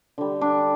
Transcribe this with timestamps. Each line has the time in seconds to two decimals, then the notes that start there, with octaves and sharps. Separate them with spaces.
0.18 D3 G3
0.41 D4